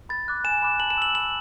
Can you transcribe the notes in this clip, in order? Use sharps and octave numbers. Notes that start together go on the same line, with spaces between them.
B5 A6
D6 F#6
G#5 E7
B5 D6 F#6
A5 F#7
E7
E6 F#7
B5 F#7